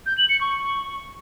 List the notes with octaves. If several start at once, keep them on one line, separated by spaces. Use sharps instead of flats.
G6
F#7
C#7
C#6